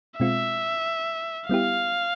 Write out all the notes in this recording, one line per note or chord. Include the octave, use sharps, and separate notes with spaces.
B2 G#3 C4 F4 E5
G3 B3 E4 G4 F5